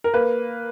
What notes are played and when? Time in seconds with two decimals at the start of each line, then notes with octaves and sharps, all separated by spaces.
0.04 A#4
0.14 A#3 B4